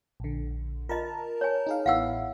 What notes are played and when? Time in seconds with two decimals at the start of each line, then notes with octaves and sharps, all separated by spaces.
0.20 A#1 D3
0.89 F4 A#4 D#5 A5 A#5
1.41 C#5 G#5
1.67 D#4 G#4 F5
1.86 A1 B3 E4 F5 F#5 E6